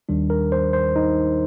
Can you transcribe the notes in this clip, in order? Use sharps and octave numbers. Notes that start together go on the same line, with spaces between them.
D#2 D#3 G3 D4
A#4
C5
C5
D#4